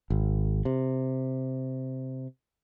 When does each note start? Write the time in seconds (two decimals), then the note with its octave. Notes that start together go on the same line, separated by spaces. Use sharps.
0.10 G#1
0.65 C3